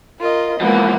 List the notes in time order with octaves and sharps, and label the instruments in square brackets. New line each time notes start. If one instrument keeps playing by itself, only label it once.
[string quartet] F4 [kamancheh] A#4 D#5
[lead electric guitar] E3 F3 [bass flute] G#3 [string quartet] A#3 [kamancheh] B3